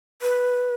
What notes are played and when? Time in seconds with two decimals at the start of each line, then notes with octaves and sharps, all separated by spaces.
0.22 B4